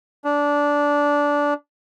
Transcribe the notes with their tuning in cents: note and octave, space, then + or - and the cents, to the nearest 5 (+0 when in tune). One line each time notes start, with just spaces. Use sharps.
D4 -15